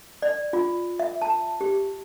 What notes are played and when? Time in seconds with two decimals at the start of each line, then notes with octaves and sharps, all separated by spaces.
0.22 D5
0.53 F4
0.99 E5
1.22 A5
1.61 G4